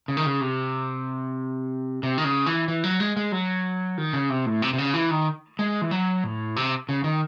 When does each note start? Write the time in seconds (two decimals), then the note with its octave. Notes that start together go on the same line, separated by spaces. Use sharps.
0.08 C#3
0.17 D#3
0.26 C#3
0.41 C3
2.03 C3
2.18 D#3
2.24 C#3
2.46 E3
2.68 E3
2.84 F#3
3.00 G#3
3.17 G#3
3.32 F#3
3.98 D#3
4.13 C#3
4.29 C3
4.46 A2
4.62 C3
4.73 C3
4.78 C#3
4.94 E3
5.11 D#3
5.59 G#3
5.82 E3
5.91 F#3
6.24 A2
6.56 C3
6.89 C#3
7.04 D#3